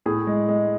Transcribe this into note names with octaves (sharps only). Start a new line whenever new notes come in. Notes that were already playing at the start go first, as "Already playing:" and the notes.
A2 G#4
G#3
G#3